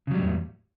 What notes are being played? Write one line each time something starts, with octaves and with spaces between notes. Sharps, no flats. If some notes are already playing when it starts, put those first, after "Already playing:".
E2 A2 C#3 F#3 G3